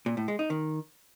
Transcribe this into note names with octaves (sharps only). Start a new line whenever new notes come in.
A#2
A2
G#3
D#4
D#3